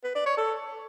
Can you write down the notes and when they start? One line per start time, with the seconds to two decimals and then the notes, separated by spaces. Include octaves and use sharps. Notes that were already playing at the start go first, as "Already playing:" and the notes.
0.04 B4
0.15 D5
0.26 C#5
0.37 A4